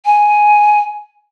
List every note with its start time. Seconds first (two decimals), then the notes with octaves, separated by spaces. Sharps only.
0.05 G#5